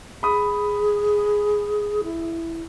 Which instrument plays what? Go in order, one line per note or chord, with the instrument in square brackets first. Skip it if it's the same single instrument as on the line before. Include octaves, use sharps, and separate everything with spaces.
[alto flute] G#4 [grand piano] B5 D#6
[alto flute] E4